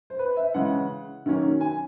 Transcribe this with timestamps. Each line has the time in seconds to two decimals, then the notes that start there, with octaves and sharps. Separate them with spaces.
0.10 C5
0.19 B4
0.37 E5
0.54 C#3 E3 G#3 F#5
1.26 D#3 F#3 A#3 C#4
1.61 G#5